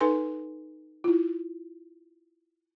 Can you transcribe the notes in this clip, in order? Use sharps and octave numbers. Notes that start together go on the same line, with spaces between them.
D#4 A4 B4 G#5 C6
E4 F4